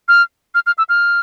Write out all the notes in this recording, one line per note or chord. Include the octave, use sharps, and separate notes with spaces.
F6
F6
F6
E6
F6